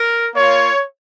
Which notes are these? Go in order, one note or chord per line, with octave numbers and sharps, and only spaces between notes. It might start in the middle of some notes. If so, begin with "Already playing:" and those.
Already playing: A#4
A#3 F4 C#5